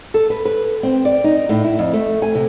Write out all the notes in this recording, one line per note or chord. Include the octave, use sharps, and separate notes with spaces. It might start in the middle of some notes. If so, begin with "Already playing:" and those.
A4
B4
B4
C4
D5
D#4
A2
E4
F2
A3
G#5
C3